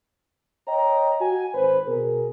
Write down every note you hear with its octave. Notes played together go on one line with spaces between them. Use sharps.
C#5 D#5 G5 A#5
F#4 G#5
G#1 B4 C5
B2 G#4 A#4